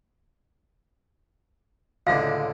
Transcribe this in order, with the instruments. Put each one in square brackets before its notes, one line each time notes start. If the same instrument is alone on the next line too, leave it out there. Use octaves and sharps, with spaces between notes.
[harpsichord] C#2 A2 D3 [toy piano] F5